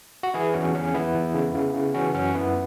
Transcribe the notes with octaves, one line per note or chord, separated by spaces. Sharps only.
F#4
E3 E4 G#4
E2 C#4 F#4
E2 C#4
E2 B3 E4
E2
C#3
C#3
C#3
E3 C#4 F#4
F#2 C#4 F#4
F#2 B3 E4